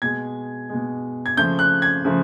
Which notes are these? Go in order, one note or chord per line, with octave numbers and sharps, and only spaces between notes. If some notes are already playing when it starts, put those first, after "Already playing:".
B2 G#3 G#6
B2 G#3
G#6
C#3 F3 A3 G6
F#6
G#6
C#3 F3 A3